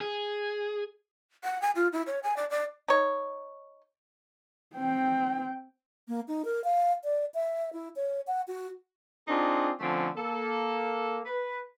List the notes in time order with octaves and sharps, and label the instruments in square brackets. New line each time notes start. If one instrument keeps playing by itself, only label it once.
[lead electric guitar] G#4
[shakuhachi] F#5
G#5
F4
E4
C#5
G#5
D5
D5
[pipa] D#4 C#5
[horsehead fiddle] C4 G5
[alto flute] A#3
D#4
A#4
F5
D5
E5
E4
C#5
F#5
F#4
[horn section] C4 D4 D#4 F4 G#4
D3 F3 A3 C4 C#4
A#3 A4
B4